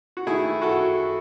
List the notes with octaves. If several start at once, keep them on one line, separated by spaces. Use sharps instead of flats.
F#4
D#3 A3 E4 G#4
F#4 A4